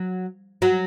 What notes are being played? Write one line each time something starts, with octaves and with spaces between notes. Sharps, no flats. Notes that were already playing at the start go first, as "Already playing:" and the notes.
Already playing: F#3
F#3